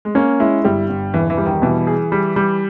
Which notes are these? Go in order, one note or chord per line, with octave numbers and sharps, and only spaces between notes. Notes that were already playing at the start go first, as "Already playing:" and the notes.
G#3
A#3 C#4
G#3 E4
G1 G3
G1
E1 E3
E3
G3
D#3
B2 E3
G#4
G3
G3